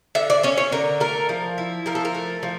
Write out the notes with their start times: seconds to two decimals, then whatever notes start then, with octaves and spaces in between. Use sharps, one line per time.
0.15 D3 E5
0.30 D5
0.43 C#4 C#5
0.58 C#5
0.72 D3 A#4
1.00 A3 A#4
1.29 F3
1.58 E4
1.86 F3 A#4
1.95 A4
2.05 A#4
2.15 A3
2.43 F3